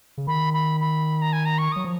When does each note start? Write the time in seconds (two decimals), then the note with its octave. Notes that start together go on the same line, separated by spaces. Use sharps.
0.18 C#3
0.27 D#3 B5
0.53 B5
0.80 B5
1.22 A#5
1.33 G#5
1.45 A#5
1.58 C#6
1.72 F#3 D#6
1.84 F3